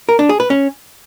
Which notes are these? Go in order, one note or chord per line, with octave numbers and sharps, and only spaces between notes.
A#4
D4
G#4
B4
C#4